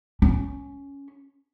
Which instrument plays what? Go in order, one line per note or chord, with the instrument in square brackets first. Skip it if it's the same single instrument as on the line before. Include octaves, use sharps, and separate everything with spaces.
[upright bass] C#4